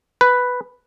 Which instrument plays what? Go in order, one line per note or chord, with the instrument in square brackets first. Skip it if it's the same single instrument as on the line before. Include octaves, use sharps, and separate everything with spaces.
[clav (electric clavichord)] B4